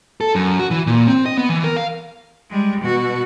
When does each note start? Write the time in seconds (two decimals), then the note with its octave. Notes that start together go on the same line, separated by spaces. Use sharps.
0.21 A4
0.35 F#2
0.59 F#4
0.71 E3
0.87 A#2
1.08 C4
1.26 D#5
1.38 B3
1.49 E3
1.64 A#4
1.77 F5
2.50 G3 G#3
2.81 B2 F#4